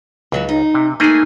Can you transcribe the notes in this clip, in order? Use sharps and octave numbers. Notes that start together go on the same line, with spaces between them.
C#2 E3 F#3 F#4
D#4
C3
A3 A#3 D#4 G#4 G#5